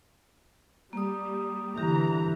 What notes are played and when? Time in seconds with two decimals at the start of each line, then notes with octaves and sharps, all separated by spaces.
0.93 G3 A#3 D#6
1.78 D3 E3 G4 A#5